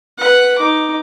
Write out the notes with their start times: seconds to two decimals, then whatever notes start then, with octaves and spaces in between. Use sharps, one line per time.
0.18 B4 F#5
0.58 D#4 D6